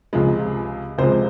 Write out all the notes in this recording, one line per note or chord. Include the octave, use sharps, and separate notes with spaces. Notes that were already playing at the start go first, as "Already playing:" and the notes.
C#2 C3 F3 G#3
C#2 C3 F3 G#3 C5